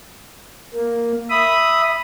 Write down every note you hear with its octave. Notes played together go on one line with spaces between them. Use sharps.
A#3
E5 B5 D#6